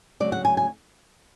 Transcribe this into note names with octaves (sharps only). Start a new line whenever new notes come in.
D2 C#3 F#3 D5
F#5
G#5
G#5